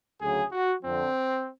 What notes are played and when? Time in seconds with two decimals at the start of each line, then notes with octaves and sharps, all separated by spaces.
0.21 D2 C#3 F#3 G#4
0.52 F#4
0.83 F2 D3 F3 C4